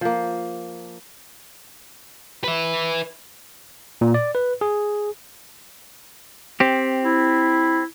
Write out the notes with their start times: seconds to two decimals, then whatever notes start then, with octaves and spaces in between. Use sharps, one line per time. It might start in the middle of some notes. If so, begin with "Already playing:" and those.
0.01 F3 A#3
2.44 B4 E5
4.01 A#2
4.14 D5
4.35 B4
4.61 G#4
6.60 C4 G4
7.05 E4